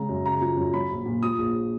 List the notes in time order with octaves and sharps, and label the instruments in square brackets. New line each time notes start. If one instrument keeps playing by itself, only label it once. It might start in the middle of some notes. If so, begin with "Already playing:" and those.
Already playing: [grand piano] C#3 G#3 A#5
F#2
C#3 A#5
F3
F#2
F#3 B5
A#1
A#2
F3 D#6
A#1